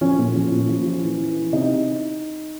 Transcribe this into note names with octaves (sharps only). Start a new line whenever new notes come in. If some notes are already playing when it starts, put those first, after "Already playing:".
F3 C#4
A#2
F3
A#2
F3
F3
E3
E3
E3
C3 D#4